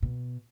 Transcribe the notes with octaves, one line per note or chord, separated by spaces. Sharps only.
B2